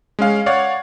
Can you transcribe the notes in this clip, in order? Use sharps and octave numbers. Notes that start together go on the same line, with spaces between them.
G#3 C#4 F5
C#5 D5 F5 F#5